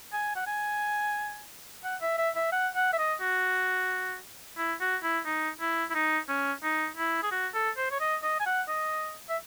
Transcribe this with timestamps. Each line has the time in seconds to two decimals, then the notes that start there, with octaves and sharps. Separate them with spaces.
0.13 G#5
0.35 F#5
0.47 G#5
1.84 F#5
2.01 E5
2.18 E5
2.35 E5
2.52 F#5
2.75 F#5
2.93 E5
2.98 D#5
3.21 F#4
4.58 E4
4.81 F#4
5.03 E4
5.26 D#4
5.60 E4
5.90 E4
5.95 D#4
6.29 C#4
6.63 D#4
6.97 E4
7.23 G#4
7.31 F#4
7.54 A4
7.77 C5
7.91 C#5
8.00 D#5
8.23 D#5
8.40 G#5
8.46 F#5
8.68 D#5
9.29 E5